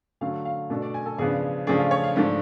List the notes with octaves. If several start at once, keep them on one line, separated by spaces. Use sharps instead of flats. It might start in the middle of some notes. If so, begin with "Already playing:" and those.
D3 F#3 A3 F5
F5
B2 A3 D4
D5
G#5
A4
C#3 F3 B3 D4 G#4
C#3 F3 A3 D4 G#4
F4
C#5
F5
G#2 F3 A3 D4